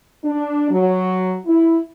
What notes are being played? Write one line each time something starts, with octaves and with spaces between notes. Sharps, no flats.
D4
F#3
E4